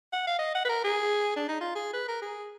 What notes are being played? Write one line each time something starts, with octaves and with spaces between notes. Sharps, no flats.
F#5
F5
D#5
F#5
B4
A#4
G#4
D4
D#4
F4
G#4
B4
A#4
G#4